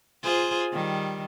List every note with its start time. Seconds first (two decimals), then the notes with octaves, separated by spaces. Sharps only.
0.23 F4 G#4 C5
0.72 D#3 G3